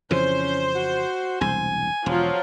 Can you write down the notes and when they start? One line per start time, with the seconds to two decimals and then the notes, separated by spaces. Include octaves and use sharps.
0.11 F2 C#3 E3 C#4 C5
0.75 F#4
1.41 E1 C2 G#5
2.06 E1 F3 F#3 F4